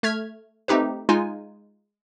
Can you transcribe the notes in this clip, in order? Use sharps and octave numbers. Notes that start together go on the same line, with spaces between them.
A3 F6 G#6 B6
A3 C4 D#4 G4 B4
G#3 D#4 F4 G#5